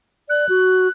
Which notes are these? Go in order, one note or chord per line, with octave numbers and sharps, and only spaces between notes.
D5 F#6
F#4